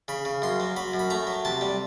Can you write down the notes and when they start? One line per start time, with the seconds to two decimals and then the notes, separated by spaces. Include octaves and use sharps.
0.08 C#3 B5
0.25 C#3
0.42 F#2 C6
0.60 F#3
0.76 F#3 B5
0.94 F#2
0.99 B5
1.10 A3 A#5
1.27 F#3
1.45 C3 A5
1.61 G3